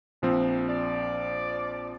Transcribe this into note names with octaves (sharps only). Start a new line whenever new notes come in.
A#1 F3 C4
D5